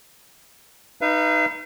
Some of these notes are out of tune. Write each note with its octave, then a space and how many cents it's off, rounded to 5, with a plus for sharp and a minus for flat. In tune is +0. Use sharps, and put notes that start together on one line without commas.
D#4 -5 B4 +0 F5 -40